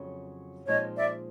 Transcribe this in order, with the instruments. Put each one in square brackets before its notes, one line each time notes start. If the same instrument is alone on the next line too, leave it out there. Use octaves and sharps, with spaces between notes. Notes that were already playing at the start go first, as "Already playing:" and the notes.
Already playing: [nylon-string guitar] F2 C#3 F#3 A3
[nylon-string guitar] A#2 F3 G#3 C4 D#4 [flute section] C#5 D#5
[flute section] D5 E5